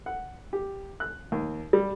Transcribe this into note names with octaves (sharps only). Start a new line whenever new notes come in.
F#5
G4
F#6
D#2
G3